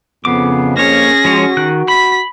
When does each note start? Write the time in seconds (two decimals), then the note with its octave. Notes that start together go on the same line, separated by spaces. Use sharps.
0.25 F2 C#3 B3 D6
0.77 A#3 C#4 G#4 C#5 A#6
1.25 F3 G#3 F#4 C#5
1.57 D#3 F#6
1.88 B5 B6